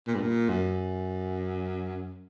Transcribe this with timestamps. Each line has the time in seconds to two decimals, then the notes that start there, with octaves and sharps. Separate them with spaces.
0.07 A#2
0.15 G2
0.22 A#2
0.49 F#2